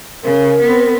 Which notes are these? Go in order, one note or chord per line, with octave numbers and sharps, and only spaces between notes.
C#3 A#4
B3 C4